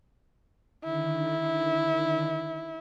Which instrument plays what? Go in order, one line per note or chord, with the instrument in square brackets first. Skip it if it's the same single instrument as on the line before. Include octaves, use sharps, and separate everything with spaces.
[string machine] D3 D#3 [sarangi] E4